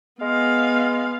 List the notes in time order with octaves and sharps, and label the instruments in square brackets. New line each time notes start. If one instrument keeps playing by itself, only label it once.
[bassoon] G#3 [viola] B3 F5